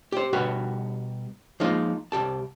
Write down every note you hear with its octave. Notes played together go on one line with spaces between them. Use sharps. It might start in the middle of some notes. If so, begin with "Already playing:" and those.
G4 C5
B2 G3 F#4 G4 A#4
F3 G#3 A#3 D#4 F4
C2 G#2 G4 A5